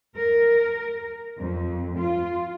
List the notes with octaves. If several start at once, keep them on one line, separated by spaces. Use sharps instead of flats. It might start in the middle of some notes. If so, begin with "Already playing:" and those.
A#4
F2
F4